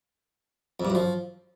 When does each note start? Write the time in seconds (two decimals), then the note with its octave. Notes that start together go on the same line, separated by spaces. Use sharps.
0.80 F2
0.85 G2
0.90 F#2
0.95 F3